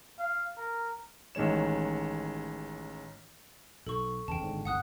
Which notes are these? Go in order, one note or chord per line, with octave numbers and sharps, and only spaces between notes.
F5
A#4
A1 D#3 G#3 C#5 E7
B1 A4 C#6
E2 C#3 B3 G5 A5
G#1 G#2 D3
G1 C2 A2 F#5 D#6 F#6